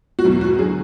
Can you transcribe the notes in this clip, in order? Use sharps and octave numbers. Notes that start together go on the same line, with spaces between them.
F#4
E2 B2 F#3 E4
F#4
D3 F#3 G#4